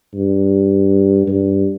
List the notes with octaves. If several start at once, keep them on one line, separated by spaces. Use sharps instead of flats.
G2
G2